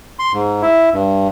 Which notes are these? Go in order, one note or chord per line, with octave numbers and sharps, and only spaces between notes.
C6
G#2
E4
G2